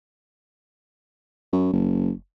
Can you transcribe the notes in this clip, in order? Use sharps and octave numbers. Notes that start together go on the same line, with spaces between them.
F#2
F#1